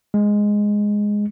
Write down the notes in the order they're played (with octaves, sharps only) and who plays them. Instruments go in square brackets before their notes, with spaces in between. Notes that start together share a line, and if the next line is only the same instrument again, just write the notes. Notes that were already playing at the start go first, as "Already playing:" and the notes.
[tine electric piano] G#3